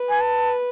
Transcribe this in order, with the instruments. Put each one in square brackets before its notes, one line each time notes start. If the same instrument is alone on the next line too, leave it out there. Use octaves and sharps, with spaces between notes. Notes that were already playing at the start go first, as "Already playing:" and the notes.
Already playing: [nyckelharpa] B4
[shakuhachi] G#5
A5